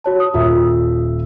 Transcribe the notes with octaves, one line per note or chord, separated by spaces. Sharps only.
F#4 C#5 A5
D#6
D#1 F4 E5